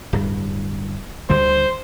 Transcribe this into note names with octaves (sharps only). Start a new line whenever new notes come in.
D1 G2
D2 D3 G3 C5